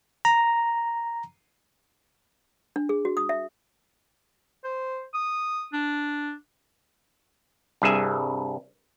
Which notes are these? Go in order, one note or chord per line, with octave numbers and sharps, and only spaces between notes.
A#5
D4
G#4
F#4
D#6
E5
C5
D#6
D4
C2 G2 G#4 E5 G#5